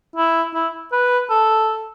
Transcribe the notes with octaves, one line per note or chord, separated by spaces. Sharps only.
E4
E4
B4
A4